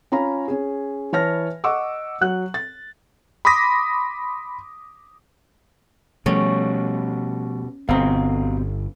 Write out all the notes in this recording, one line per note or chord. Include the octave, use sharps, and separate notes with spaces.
C#4 F4 A#5 B5
C#4 G#4
E3 B4 C#5 A5 F6 A#6
D#5 F#5 C#6 D6 E6
F#3 F#5 F#6
A6
B5 C6 D6 D#6 A#6 B6
B2 F3 G3 A3 C#4
G1 B2 C4 F5 A#5 D#6